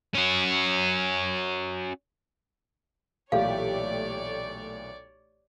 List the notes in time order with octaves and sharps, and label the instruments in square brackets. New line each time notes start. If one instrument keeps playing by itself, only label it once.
[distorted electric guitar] C#4 F#4
[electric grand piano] B1 A#2 E3 [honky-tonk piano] A3 G4 [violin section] C#5 D5 [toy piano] F5